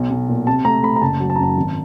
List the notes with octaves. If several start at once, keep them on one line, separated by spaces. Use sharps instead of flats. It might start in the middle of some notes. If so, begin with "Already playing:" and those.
Already playing: B1
B1
A#2
C3 A5
A3 A#5
A3 B5
A#5
F#1 A5
F#3
A5
F#2 A#5
A5
G#1